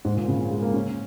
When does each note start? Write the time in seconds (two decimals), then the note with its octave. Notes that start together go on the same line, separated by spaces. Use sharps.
0.05 G#2
0.16 A#2
0.28 C#3
0.40 C#4
0.51 G#3
0.62 A#3
0.74 C#4